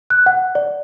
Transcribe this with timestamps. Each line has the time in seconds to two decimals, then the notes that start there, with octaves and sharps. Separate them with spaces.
0.10 F#6
0.26 F#5
0.55 D5